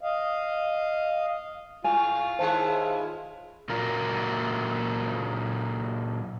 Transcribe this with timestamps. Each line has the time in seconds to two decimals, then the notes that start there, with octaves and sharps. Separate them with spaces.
0.01 D#5 F5
1.84 G#2 F4 G#5
2.39 D#2 G#3 E4 C5 F5 A5
3.69 A#2 F#3 F4 A#4